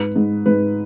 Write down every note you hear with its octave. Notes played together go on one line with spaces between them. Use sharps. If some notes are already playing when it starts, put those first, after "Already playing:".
Already playing: G#2 B4
G#2
G#2 B4